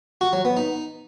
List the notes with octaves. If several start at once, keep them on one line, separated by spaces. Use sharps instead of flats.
F#4
F#3
B3
D#4